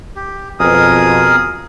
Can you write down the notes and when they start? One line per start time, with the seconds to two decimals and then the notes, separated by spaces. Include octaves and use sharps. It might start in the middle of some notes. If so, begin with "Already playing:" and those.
0.16 G4
0.59 F2 B2 G#4 A#4 D#6